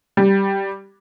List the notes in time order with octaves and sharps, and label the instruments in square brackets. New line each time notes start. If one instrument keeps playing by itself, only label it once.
[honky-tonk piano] G3